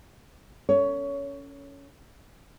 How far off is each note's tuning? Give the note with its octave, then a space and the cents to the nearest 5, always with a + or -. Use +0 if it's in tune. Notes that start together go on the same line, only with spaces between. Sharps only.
C#4 +15 A4 +35 C#5 +20